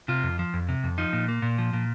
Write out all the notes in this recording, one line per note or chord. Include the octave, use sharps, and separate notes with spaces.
C3 F4
F2
F3
F2
C3
F2
F3 D#4
A#2
A#3
A#2
F3
A#2